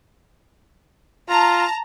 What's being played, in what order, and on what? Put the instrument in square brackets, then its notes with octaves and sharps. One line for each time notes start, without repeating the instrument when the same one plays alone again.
[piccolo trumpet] F4 [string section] A5 A#5